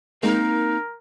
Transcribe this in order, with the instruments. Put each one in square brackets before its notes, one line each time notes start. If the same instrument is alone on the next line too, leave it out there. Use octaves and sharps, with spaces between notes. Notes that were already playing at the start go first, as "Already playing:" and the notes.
[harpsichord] G#3 [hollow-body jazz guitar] A#3 C4 [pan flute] D#4 [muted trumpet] A#4